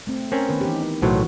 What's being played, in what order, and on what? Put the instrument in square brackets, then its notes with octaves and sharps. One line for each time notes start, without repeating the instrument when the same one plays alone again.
[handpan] A3 C4
[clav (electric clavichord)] C4 C#4 [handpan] A#4
[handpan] D#3 B3 B4
E3 D#4 G4
[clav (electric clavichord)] B1 A2 F#3 [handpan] E3 F#4 C5